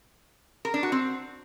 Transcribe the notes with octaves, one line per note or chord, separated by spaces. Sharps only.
A#4
D4
F#4
C4